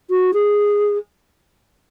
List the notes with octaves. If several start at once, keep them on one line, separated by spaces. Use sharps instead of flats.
F#4
G#4